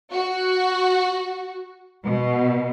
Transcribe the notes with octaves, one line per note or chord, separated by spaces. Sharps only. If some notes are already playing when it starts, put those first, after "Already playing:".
F#4
B2